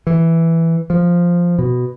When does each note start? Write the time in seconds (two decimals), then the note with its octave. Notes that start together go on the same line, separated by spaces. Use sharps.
0.07 E3
0.90 F3
1.59 B2